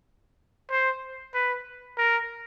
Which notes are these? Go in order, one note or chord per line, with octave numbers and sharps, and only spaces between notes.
C5
B4
A#4